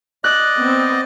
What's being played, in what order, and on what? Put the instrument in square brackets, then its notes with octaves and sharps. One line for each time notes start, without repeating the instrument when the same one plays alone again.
[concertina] D5 D#5 [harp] F#6
[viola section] B3 C4